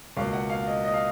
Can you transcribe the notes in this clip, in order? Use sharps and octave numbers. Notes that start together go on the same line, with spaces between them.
C#2 B2 A#3 F5
F#5
F5
D#5
D#5
F5